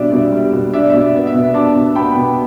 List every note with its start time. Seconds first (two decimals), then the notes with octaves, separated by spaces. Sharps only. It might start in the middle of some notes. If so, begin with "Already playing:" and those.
Already playing: B2 G3 D4 D5 E5
0.10 B2 D5
0.19 E5
0.32 G3
0.53 B2
0.73 D4 E5
0.82 D5
0.90 E5
0.94 B2
1.00 D5
1.15 B3
1.27 E5
1.34 B2
1.54 D4 A5 D6
1.76 B2
1.95 B3 G5 B5
2.16 B2